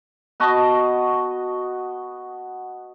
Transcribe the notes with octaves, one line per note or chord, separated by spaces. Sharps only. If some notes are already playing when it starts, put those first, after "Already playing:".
B3 F#4 D#5 A5